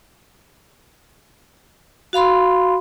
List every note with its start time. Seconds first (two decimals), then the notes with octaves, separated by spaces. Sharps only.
2.13 F#4 F5 B5 C6